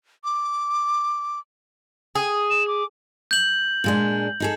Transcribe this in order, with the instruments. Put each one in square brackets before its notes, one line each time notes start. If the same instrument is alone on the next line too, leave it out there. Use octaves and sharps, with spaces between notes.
[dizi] D6
[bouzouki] G#4
[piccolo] E7
D6
[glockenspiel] G6 F#7
[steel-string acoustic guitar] A#2 G#3 D4
D#4 G#4 A4